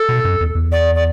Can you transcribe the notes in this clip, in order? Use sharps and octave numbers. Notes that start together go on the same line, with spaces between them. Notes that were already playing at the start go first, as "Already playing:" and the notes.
Already playing: A4
B2
F#2
E2
E2
D5
D5